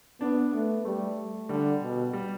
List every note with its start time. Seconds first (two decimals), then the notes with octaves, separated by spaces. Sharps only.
0.21 B3 D4
0.52 A3 B3
0.85 G3 A3
1.49 D3 G3
1.81 B2
2.13 G3